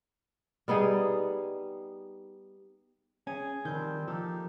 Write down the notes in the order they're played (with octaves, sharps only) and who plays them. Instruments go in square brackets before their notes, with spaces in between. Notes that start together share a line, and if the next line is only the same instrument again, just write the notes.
[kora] G3 B3 D#4 G#4
[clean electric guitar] C#4 [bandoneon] G#4 [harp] G#5
[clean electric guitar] D#3 [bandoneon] F3 G3 C4 [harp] G6
[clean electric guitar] F3 [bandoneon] A#3 D#4 G4 [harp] A4